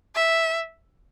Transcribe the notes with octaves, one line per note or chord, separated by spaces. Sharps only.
E5